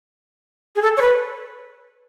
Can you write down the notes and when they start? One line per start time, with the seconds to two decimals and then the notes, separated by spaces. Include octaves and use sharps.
0.76 G#4
0.82 A4
0.97 C#5
1.01 B4